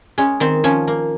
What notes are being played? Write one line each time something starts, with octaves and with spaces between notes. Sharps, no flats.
G#3 C#4
D#3 C4
F3 C#4
A#3